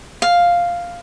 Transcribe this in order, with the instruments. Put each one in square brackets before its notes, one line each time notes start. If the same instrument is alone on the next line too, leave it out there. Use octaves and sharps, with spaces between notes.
[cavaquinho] F5